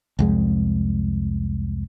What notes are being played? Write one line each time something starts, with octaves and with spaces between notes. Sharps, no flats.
C2 F2 G#3